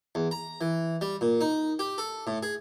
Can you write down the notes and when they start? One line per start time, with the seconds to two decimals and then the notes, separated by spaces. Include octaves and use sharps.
0.15 E2
0.31 A#5
0.61 E3
1.01 G3
1.21 A#2
1.41 D#4
1.79 G4
1.98 A4
2.27 A2
2.43 G#4